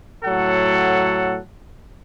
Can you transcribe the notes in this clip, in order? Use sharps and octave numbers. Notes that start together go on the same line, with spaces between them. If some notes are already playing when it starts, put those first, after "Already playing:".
A2 F#3 A4 F#5